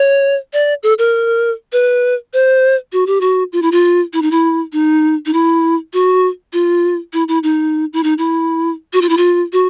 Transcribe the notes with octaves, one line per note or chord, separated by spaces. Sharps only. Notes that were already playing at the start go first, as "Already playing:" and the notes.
Already playing: C#5
D5
A4
A#4
B4
C5
F#4
G4
F#4
F4
E4
F4
E4
D#4
E4
D#4
D#4
E4
F#4
F4
E4
E4
D#4
E4
D#4
E4
F#4
F4
E4
F4
F#4